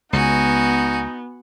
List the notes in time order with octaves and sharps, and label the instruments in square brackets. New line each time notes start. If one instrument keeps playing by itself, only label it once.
[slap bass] C#2 [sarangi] B3 [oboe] D#4 [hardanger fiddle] F#4 G#5